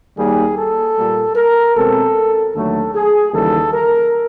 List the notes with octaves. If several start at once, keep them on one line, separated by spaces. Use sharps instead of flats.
D#2 D#3 G3 A#3 G#4
A4
A#2 G3 A#3
A#4
B2 G#3 C4 A4
D#2 D3 F#3 A3 A4
G#4
D#2 C#3 E3 G3 A4
A#4